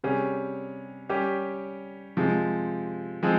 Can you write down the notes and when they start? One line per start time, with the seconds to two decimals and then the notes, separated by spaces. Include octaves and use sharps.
0.04 C3 G3 C#4 G#4
1.09 G3 C#4 G4
2.17 C3 F3 G#3
3.23 F3 G#3 C4